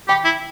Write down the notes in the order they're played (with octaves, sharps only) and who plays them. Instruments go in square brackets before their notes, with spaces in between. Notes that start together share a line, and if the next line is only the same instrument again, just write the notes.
[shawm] G4 [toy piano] G5 B5
[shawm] E4